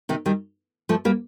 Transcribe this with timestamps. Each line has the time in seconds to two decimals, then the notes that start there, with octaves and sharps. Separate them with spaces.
0.09 C3 D#3
0.26 D#3 G3
0.89 F3 A3
1.05 G3 A#3